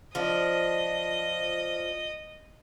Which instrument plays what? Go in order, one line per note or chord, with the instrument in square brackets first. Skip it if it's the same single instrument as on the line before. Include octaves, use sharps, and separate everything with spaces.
[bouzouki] F3 D4 [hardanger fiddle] D#5